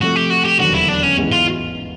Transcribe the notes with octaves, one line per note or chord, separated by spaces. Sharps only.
C3 F3 A3 F#4
G4
F#4
G4
E1 D#2 D3 F#3 F#4
E4
D4
C#4
A1 G#2 E3 G#3 B3
F4